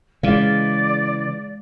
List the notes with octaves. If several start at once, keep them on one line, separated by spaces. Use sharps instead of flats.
C#3 E3 G#3 D5 F5